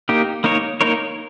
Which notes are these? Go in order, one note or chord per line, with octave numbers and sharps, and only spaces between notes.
A#3 D#4 G4
A#3 D#4 A#4 C#5
A#3 D#4 A#4 C#5